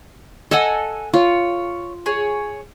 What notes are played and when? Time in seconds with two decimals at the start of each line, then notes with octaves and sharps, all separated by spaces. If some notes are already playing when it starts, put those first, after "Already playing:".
0.51 A4 D#5 F#5 G#5 E6
1.14 F4 C#5
2.06 G#4 C#5